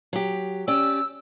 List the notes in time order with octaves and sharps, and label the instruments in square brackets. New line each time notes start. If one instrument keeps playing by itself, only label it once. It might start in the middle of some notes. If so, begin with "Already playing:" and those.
[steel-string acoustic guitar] F#3 G4
[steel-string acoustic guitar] C#4 G4 D5 [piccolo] E6